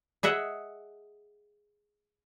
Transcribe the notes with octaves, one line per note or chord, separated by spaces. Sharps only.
G#4 D#5 E5 F#5